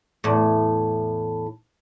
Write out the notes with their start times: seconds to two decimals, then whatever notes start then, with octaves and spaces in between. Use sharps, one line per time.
0.24 E2 A2